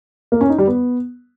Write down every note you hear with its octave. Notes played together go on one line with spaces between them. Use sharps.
A#3
C#4
D#4
G3
B3